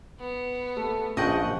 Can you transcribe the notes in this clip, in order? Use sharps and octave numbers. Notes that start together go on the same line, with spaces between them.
B3
A3
A#1 C#3 F3 D#5 F#5 G5 C#6